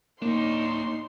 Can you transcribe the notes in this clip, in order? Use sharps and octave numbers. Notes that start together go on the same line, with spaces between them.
A2 A#3 D4 D#4 C6